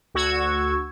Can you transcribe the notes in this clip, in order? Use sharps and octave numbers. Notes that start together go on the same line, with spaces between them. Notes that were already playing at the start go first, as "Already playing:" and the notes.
D2 F#4 C#6 E6 G#6